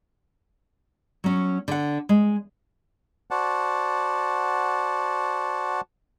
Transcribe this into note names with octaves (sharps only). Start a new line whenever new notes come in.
F#3 C#4
D3 F#5
G#3
F#4 C5 D5 F#5 A5